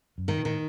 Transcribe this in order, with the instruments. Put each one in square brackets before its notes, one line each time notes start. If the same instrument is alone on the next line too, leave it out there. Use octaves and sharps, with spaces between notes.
[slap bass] F#2
[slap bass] G2 [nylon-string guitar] D#3
[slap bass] A#2
[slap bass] A2 [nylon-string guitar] D#3